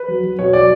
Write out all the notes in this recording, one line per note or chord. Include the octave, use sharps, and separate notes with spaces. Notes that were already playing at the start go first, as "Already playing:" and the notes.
Already playing: B4
F#3
F#3
B2 C#5
F#3 D5